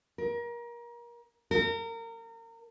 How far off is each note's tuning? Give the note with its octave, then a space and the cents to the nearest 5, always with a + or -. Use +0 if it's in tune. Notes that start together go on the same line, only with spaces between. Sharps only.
A#4 +30
A#4 -30